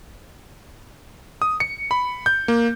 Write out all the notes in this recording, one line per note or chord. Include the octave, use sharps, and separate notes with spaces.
D#6
C#7
B5
G6
A#3